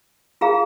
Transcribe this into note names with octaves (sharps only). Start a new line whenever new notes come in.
F4 G#4 F5 A#5